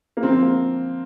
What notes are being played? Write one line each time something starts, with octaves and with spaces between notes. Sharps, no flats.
A#3
D3 F3 C4
A#3